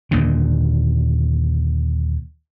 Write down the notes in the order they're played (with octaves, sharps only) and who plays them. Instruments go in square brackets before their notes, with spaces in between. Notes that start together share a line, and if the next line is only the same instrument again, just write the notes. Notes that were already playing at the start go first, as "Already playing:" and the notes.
[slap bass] D#2 A#2 D3